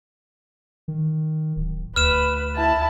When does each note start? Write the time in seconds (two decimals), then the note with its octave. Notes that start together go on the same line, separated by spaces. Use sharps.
0.88 D#3
1.56 D1
1.96 D2 B4 F6 E7
2.56 E4 A5